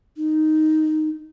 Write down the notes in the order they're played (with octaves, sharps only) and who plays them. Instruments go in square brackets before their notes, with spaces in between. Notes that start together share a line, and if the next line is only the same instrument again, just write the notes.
[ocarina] D#4